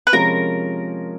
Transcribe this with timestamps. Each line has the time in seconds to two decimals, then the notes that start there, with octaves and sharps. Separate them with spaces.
0.07 B4
0.12 C3 F3 G#3 C#4 F4 A#4